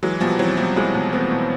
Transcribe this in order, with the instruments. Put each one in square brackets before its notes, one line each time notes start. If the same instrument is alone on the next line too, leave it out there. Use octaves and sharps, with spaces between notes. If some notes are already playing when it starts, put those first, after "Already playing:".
[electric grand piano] E3 F#3 [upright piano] G#3
[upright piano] B2 [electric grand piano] F3 G3
[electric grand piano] E3 F#3 [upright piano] C4
[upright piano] B2 [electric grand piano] F3 G3
[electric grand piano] F3 G3 [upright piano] G#3
[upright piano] B2
[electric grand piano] A3 B3 [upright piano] C4
[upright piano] B2